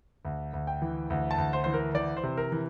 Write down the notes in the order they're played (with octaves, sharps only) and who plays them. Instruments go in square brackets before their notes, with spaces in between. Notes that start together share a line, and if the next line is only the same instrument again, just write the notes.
[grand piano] D2
D2
G5
E3
D2
A5
D2
C5
E3 C5
A#4
E3 D5
C5
C3
A#4
E3